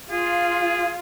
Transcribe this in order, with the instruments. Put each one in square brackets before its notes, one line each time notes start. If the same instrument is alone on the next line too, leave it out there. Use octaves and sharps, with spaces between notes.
[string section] F4 [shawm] G#4